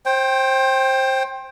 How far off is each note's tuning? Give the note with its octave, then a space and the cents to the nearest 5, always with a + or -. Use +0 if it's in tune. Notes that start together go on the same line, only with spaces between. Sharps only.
C5 +25 G5 +0